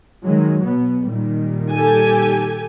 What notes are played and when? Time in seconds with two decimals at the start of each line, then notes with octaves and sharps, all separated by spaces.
0.24 D#3 F#3 G#3
0.63 B2 B3
1.09 A#2 D#3 G3
1.72 G4 A4 G#5